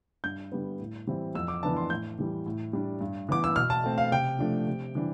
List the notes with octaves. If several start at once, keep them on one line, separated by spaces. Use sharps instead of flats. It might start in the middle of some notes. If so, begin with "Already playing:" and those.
G2 G6
D3 G3 B3
A2
E3 G3 C4 E4
F2 E6
D6
E3 B3 D4 A5
C6
A2 G6
E3 G3
A2
G3 D4
G2
E3 B3 D6
E6
B2 F6
A5
A3 C4
F5
C3 G5
F3 A3 D4
C3
E3 G3 D4